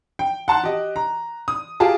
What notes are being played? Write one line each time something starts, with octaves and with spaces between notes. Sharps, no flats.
G5
F#5 A5 C6 F#6
G4 D#5
A#5
D#6
F4 G4 G#4 A5